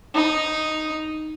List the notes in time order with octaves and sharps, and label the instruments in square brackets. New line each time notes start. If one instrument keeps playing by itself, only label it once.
[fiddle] D#4